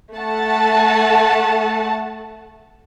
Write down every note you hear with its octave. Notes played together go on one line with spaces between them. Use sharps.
A3 F#5 A5